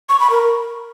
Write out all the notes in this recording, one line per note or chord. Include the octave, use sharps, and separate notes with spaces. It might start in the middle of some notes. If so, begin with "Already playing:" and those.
C#6
B5
A#4